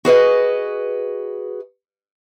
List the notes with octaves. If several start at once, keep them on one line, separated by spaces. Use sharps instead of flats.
F#4 G#4 B4 D#5